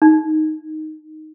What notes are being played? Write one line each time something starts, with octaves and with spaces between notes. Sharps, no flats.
D#4